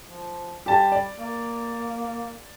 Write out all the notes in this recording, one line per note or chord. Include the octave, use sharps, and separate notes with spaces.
F3
G3 G4 A5
D5
A#3